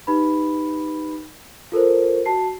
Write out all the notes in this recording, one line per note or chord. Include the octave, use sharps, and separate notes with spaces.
D#4 G4 B4 B5
F4 A4 A#4 C5
F#4 A5 C7